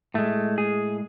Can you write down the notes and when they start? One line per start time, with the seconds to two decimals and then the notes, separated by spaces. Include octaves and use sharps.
0.14 A2 G#3 A3
0.58 G#4